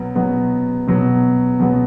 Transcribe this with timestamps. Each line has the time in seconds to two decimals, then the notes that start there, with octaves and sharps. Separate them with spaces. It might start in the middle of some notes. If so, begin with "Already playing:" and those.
Already playing: B2 F#3 B3
0.15 B2 F#3 B3
0.87 B2 F#3 B3
1.59 B2 F#3 B3